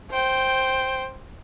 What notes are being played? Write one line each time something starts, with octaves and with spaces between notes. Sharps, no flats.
C5 G5